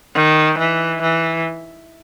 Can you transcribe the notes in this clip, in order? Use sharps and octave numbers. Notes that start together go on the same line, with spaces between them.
D#3
E3
E3